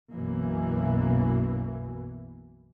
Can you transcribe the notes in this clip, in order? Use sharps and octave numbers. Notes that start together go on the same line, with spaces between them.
B1 F#2 B2 E3 A#3